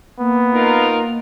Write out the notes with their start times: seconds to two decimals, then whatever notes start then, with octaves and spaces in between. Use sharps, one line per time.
0.20 A#3 B3
0.53 D#4 F4 A#4